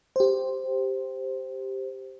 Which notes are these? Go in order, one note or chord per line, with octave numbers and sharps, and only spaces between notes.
G4 C5